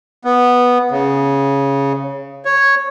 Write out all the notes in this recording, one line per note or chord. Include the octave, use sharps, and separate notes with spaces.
B3
C#3
C#5